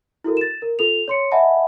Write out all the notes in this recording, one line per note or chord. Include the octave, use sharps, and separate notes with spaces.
E4 F#4 A4 A#4
A6 E7
A#4
F4 A4 F7
C#5 C6 C#7
D#5 E5 F#5 G#5 A5 B5